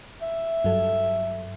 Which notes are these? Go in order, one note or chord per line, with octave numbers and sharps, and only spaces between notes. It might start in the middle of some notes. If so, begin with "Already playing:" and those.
E5
G2 F#3 A4